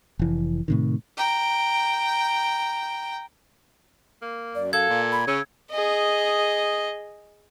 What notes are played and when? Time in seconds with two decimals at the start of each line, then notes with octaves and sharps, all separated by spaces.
0.19 F1 E3
0.68 A2 C3 D#3
1.17 G5 A#5
4.22 A#3
4.55 F#2 D5
4.73 A4 F5 G#6
4.89 A#2
5.12 B5
5.27 C#3 C#4 E6
5.71 G#4 D#5